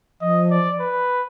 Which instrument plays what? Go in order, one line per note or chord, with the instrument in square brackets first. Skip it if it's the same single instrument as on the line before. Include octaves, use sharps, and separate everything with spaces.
[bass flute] F3 [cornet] D#5
[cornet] D5
B4